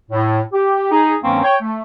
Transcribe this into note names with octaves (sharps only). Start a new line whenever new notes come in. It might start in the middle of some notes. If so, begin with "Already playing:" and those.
A2
G4
D#4 G#4
G2 D#3 F#3 A#3 C4 C#4
C#5 G5
A3